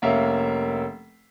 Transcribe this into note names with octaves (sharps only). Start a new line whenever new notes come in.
F1 A#3 C#4 E5 F5